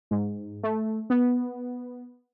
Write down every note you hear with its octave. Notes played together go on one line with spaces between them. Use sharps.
G#2
A3
B3